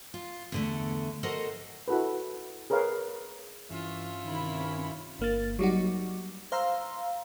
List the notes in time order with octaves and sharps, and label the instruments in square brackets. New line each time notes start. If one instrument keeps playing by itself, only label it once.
[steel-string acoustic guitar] F4
E2 D3 A3
F#4 A4 A#4 C5 D#5 F#5
[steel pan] E4 F#4 A4 B4
G#4 A#4 B4 C#5 F5
[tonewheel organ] G2 C#4 [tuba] E3 [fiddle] F4 E5
[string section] C3 E4 B5 [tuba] D#3
[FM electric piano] G1 A#3 A6
F#3 G3 D#4 F#4
C5 F5 A#5 C6 E6